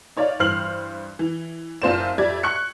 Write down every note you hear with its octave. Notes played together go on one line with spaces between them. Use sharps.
D#4 C#5 D5 F5
G2 E3 C5 F6 C7 F#7
E3
F#1 C4 F4 C5 D5 E7
F2 G4 D5 E5 G#6
C#6 F#6 C#7